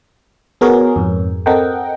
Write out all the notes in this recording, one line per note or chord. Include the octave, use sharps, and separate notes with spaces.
B3 F#4 G#4 A#4 C#5
F2 G#2
C4 A4 A#4 D#5 F#5 G5